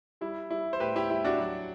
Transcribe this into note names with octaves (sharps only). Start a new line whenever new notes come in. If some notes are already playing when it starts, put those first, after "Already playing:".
G3 E4
G3 E4
C5
A2 G4 B4
E4 G4
G3 E4
D4 F#4
F#3